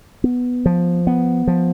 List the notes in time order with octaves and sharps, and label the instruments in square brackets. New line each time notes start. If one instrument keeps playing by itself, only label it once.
[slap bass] B3
F3
B3
F3